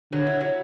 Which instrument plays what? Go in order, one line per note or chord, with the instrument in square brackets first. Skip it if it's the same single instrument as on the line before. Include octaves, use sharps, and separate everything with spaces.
[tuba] D3 [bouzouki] F#3
[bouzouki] E4
F#3